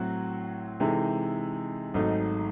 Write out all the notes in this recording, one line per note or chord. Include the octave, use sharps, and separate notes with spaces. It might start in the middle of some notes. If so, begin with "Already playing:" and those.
Already playing: A2 F#3 C4 F#4
C3 E3 G#3 D#4 A4
G#1 G#2 F#3 A3 D#4